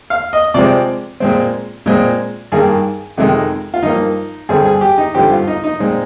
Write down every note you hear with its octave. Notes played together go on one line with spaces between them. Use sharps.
F5
D#5
C3 F3 G#3 C4 D5
A#2 G#3 C4
A#2 G#3 C4
G2 D#3 A#3 G#4
F2 C3 D#3 G#3
F4
G2 F3 A#3 D#4
G2 D3 G3 C4 G#4
G#4
G4
D#4
G2 D3 F3 C4 G4
F4
D#4
D#4
A#2 G#3 C4